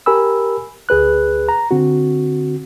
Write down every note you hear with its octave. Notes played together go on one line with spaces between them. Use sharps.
G4 A#4 G#5 B5 E6
D2 G#4 B4 F#6
A#5
D3 C4 F#4